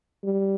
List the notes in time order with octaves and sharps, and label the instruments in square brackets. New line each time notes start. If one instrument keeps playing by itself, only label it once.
[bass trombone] G3